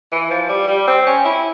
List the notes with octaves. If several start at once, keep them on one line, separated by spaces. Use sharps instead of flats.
E3
F3
G3
G3
C4
C#4
E4